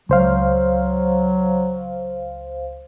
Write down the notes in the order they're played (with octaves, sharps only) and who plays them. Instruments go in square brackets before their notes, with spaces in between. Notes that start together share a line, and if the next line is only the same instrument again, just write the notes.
[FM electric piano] C#2 C5 F5 [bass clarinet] F#3